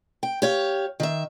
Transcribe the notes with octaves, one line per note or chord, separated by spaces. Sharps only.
G5
G4 C#5 F5
D#3 E5